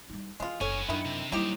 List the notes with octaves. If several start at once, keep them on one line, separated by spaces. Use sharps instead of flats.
G3 D#4
E3 G#3 C#4 F4
F#1 B3 C#4 A4 G#5
F#2 D#3 D4 E4 A#4
C3
F#3 G3 A#3 D#4 E4 G4 C5